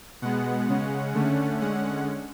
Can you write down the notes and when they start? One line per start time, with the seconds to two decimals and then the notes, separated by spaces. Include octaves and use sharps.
0.22 B2 G#3 B3 F#5
0.68 C#3 G#3 C#4
1.14 D3 A3 C#4
1.60 D3 G#3 C#4 F#5